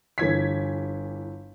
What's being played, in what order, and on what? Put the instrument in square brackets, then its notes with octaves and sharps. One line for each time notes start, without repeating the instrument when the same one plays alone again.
[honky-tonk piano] G1 E3 G#6 B6